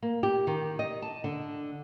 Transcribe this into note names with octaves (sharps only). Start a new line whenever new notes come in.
A#3
G4
D#3
D#5
A5
D3